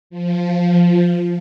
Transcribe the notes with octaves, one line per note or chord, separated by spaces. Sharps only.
F3